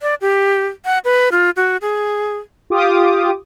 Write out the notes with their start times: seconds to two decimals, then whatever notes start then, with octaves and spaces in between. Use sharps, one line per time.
0.02 D5
0.21 G4
0.85 F#5
1.05 B4
1.32 F4
1.56 F#4
1.82 G#4
2.70 F4 G4 D6 D#6